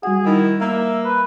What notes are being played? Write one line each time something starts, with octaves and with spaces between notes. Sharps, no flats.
G3 F#4 G#4 F#5
D#3 E4
A#3 E5
B4